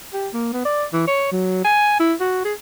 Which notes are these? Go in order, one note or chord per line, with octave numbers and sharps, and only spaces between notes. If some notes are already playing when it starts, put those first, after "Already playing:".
G4
A#3
B3
D5
E3
C#5
F#3
G#5
E4
F#4
G#4